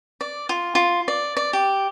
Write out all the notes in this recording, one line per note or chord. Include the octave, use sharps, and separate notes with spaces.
D5
F4
F4
D5
D5
G4